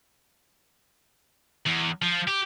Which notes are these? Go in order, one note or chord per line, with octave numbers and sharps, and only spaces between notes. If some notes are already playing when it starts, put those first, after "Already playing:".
E2
F3
G4